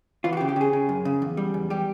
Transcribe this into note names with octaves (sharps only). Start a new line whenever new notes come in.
E3 F4
F#4
G4
C#3
G4
C#3 G#4
C#3
F#2
C#3
E2
G3
E2
G3 G4